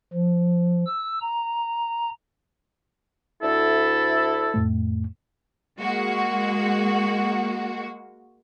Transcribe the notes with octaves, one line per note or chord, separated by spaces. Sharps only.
F3
E6
A#5
D2 E4 A4
F2 A2 A3
G#3 A#3 F#4